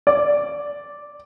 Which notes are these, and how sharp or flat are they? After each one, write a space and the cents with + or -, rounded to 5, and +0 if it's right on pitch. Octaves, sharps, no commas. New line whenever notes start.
D5 +0